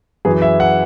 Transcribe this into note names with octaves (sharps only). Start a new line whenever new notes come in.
F#2 E3 G#4
E5
F#5